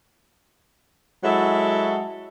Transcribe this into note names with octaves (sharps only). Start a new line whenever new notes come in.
F#3 G#3 E4 F#4 A4 E5